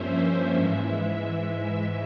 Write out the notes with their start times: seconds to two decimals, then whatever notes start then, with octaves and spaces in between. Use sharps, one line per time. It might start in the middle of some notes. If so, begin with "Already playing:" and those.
Already playing: G2 F3 A#3 C#4 C5 E5
0.53 G#2 E3 G#3